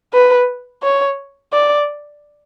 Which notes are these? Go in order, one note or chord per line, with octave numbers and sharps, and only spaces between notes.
B4
C#5
D5